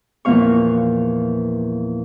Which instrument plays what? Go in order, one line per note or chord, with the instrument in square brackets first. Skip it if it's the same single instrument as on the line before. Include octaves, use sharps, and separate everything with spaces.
[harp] E2 A#2 F3 B3 F5 C#6